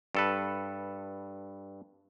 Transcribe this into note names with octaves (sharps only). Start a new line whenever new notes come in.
G2 A4 B4